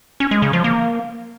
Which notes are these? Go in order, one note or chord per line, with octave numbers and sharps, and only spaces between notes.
C#4
G#3
C#3
F3
A#3